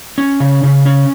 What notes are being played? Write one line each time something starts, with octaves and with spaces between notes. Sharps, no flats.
C#4
C#3
C#3
C#4